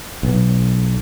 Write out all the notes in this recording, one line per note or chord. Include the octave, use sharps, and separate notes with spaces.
B1